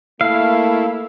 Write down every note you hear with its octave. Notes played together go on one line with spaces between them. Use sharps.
A3 A#3 E4 F5